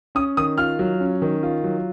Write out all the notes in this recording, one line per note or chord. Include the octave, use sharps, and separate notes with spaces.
C#4 D#6
D#3 D#6
F4 F6
F#3
C#4
D#3
F4
F#3